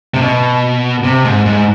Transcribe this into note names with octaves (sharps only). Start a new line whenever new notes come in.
C3
B2
C3
G#2
G#2